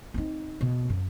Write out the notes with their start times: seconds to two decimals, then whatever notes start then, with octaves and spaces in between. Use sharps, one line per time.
0.14 C4 D#4
0.61 B2
0.90 F#2